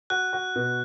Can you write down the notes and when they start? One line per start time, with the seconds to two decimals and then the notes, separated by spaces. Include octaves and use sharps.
0.10 F#4 F#6
0.33 F#4
0.56 B2